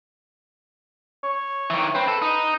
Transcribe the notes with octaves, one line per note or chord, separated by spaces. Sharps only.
C#5
D#3 E3
C4 B4
A4
D#4